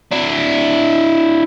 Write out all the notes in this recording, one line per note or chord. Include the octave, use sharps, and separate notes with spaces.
D4 E4